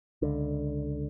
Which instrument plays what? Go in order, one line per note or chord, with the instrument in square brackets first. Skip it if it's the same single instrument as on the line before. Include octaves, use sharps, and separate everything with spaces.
[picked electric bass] C#2 D3